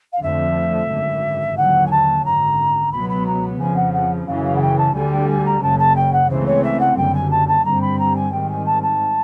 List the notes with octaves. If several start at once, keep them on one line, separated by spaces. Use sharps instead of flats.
F5
F2 D3 F3 A3 E5
G#1 F#2 D3
D#2 D3 F#3 F#5
G#5
A5
G#1 F#2 D3 A#5
C#2 B2 F#3 B3 B5
B5
A#5
F2 C#3 F3 G#5
F#5
F#5
F#2 C#3 E3 F5
F5
F#5
G5
A5
D2 D3 G3 G#5
G5
G#5
A#5
F#1 F#2 C#3 A5
A5
G5
F#5
C#2 C#3 E3 A3 C4 C5
C#5
E5
F#5
F#1 F#2 D3 G3 G5
G#5
A5
A5
G2 D3 G3 C4 A#5
B5
A#5
G#5
G#2 D#3 G3 C4 G5
G#5
A5
A5